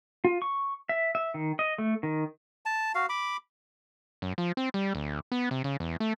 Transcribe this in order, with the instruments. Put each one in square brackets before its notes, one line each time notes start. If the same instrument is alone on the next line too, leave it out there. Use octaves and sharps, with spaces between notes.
[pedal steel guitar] F4
C#6
E5
E5
D#3
D#5
A3
D#3
[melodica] A5
F#4 F5
B5 D6
[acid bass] F#2
F3
C4
G3
D2
B3
C3
C#3
E2
A3